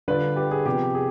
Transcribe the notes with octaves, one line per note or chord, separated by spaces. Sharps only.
D3 G3 D4 F4 B4 D5
G4 B4
G#4
C3 F3 B3 G4
G#4